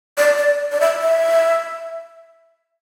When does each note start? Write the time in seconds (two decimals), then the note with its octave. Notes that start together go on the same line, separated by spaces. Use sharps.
0.18 D5
0.38 D5
0.72 D5
0.81 E5
1.02 E5